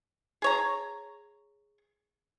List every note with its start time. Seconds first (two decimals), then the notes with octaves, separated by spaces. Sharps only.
0.42 G#4 C#5 A#5